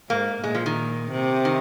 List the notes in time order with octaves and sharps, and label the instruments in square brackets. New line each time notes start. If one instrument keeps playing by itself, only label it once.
[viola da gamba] G#2 [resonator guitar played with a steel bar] A#3
[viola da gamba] A#2 [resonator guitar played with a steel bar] G#3
[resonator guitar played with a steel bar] F3
D#3
[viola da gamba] C3
[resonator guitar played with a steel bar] D#3